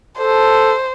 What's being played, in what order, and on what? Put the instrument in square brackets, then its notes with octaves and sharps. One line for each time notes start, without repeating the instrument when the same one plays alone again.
[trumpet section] A4 [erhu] C5